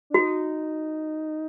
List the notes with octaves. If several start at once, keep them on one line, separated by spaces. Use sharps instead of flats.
D4
D#4 F#4